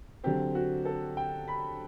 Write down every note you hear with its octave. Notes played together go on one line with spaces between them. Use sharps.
D3 F#3 C4 G4
F#4
A4
G5
B5